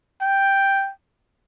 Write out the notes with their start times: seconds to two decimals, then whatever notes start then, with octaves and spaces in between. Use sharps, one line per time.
0.21 G5